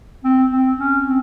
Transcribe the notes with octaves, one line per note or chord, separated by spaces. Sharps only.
C4
C4
C#4
C4